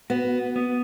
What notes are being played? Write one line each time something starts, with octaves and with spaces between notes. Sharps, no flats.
B3 F#4
B3